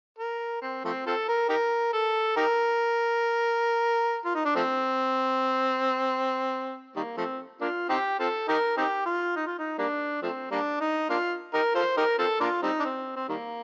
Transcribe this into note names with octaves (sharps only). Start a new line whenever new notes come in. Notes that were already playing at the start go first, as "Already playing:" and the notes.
A#4
C4
F3 A3 C4
C4 F4 A4
A#4
D#4 G4 A#4
A4
D#4 G4 A#4
F4
D#4
D4
F3 A3 C4
D#3 G3 A#3
F3 A3 C4
A#3 D4 F4
C4 D#4 G4
C4 F4 A4
D#4 G4 A#4
C4 D#4 G4
F4
D#4
F4
D#4
G3 A#3 D4
F3 A3 C4
G3 A#3 D4
D#4
A#3 D4 F4
D#4 G4 A#4
F4 A4 C5
D#4 G4 A#4
C4 F4 A4
A#3 D4 F4
G3 C4 D#4
D4
C4
C4
D#3 G3 A#3